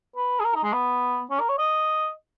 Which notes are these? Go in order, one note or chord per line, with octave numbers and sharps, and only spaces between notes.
B4
G#4
A#4
D#4
G#3
B3
C#4
A#4
C#5
D#5